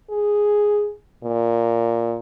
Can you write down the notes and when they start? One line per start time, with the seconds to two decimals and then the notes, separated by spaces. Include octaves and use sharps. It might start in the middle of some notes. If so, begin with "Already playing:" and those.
0.10 G#4
1.24 A#2